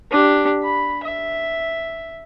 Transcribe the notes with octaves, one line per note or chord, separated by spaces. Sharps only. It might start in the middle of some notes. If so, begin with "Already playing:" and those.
D4 G4
B5
E5